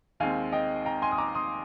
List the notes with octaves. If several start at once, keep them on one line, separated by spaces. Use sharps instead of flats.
D#2 D#3 G#3 C4 F5 G#5
D#5 G5
G5 A#5
G#5 C6
D#6
A#5 D6
C6 D#6